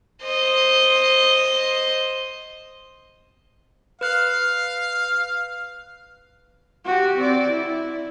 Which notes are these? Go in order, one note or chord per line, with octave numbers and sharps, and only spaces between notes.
C5 D#5
B4 F5 F#6
F#4 G4
C4 D5
E4